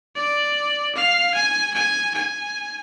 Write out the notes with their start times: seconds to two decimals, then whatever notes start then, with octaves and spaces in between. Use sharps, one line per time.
0.16 D5
0.95 F5
1.34 G#5
1.74 G#5
2.14 G#5